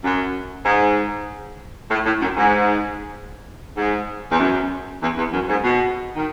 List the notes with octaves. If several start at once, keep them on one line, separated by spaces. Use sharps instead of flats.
F#2
G#2
A2
A2
F#2
G#2
G#2
E2
F#2
E2
E2
F#2
G#2
B2
D#3